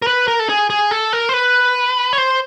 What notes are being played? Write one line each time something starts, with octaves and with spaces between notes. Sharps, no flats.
A#4
B4
A#4
A4
G#4
G#4
A4
A#4
C5
B4
C#5
C5